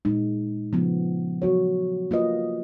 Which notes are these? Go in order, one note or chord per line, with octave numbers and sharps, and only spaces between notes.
A#2 G#3 D#4
C#3 F3 B3
F#3 B3 F#4 C#5
A#3 F4 B4 D#5